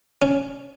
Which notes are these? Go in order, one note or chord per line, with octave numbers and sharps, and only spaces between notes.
C#4